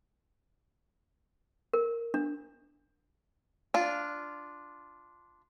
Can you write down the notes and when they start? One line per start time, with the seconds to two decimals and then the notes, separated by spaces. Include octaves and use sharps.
1.73 A#4
2.14 D4
3.74 D4 F4